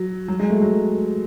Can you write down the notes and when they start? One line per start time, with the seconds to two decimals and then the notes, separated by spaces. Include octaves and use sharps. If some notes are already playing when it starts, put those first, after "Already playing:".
Already playing: F#3
0.28 F#3
0.40 G#3
0.50 A3
0.62 F#3